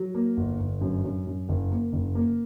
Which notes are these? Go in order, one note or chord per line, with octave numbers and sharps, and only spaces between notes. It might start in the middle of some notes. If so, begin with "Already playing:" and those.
Already playing: F#3
A#3
G1
G1
F#2
F#2
F#2
F#1
A#3
F#1
A#3